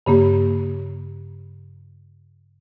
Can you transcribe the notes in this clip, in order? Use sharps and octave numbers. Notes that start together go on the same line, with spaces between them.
G2 C#3 A#3 G4